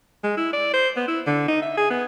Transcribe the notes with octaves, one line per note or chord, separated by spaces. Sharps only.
G#3
E4
D5
C5
B3
E4
D3
D#4
E5
G#4
B3